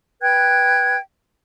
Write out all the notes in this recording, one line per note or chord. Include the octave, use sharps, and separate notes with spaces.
B4 G5 F#6 G#6